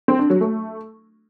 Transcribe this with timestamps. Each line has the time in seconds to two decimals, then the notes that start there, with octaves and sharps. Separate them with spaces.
0.08 C4
0.19 D4
0.30 F#3
0.41 A3